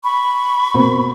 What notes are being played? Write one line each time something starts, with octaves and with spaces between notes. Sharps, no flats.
B5 C#6
B2 A#3 C4